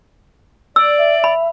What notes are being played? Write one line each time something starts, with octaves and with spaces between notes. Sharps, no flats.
D5 E6
E5
B5